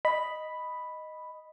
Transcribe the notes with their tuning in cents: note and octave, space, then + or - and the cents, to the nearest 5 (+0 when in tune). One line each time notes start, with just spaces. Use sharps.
D#5 +0 B5 +0